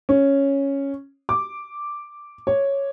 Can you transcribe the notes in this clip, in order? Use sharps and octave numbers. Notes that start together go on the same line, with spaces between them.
C#4
D6
C#5